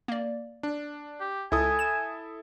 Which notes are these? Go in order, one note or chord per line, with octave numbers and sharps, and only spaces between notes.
A#3 D5
D4
G4
C#2 E4 A4 G#5 D#6
E7